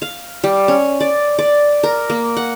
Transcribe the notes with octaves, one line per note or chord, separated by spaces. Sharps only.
F5
G3
C#4
D5
D5
A#4
A#3
F#5